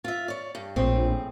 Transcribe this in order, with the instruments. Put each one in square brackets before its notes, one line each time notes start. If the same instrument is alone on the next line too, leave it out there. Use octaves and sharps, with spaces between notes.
[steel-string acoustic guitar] F4 E5
C#5 D5
G2
[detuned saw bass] A#1 [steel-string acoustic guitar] A2 C4 G#4